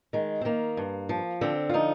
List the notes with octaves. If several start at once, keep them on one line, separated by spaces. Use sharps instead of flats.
D#3 G#3
C4
D#3 A#3
G2
F3
D3 C4
F4
F3 D#4